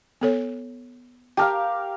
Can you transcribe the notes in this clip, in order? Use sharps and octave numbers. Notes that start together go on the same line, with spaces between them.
B3 A4 C#5
G4 A#4 F5 G5 A5